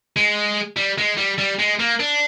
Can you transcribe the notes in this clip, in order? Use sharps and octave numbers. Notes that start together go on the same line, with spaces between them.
G#3
G3
G#3
G3
G3
G#3
A#3
D4